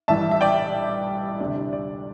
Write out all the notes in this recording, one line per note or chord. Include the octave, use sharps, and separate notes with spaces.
A1 G2 E3 E5 A5
E5
D5 G5
D2 C3 G3 D4 D5
D5